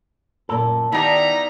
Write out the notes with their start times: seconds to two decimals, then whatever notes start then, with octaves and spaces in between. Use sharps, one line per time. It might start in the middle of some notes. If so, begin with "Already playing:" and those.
0.49 F#2 A#2 A4 A#4
0.92 D#3 G3 B3 D#4 E4 A#5